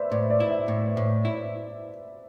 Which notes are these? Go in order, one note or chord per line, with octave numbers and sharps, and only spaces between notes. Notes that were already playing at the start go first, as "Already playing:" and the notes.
Already playing: B4 C5 D5 E5
A2 D5
D5
E4
E5
A2
A2
E4